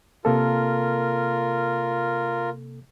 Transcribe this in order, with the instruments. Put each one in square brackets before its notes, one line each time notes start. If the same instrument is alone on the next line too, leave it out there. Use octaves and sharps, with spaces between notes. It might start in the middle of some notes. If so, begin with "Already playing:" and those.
[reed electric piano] C3 A#3 A4 [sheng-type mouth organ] F4 A#4